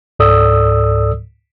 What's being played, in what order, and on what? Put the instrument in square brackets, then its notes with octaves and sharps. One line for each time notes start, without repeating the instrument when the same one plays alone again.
[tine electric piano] C#2 G#2 A4 D5 D#6 E6